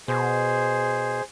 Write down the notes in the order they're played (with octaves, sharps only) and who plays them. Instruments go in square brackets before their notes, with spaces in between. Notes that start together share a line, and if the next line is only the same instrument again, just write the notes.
[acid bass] B2 [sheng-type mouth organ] G#4 C5